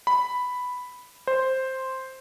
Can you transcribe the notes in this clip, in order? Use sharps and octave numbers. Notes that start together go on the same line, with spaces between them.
B5
C5